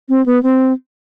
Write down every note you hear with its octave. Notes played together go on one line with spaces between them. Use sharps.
C4
B3
C4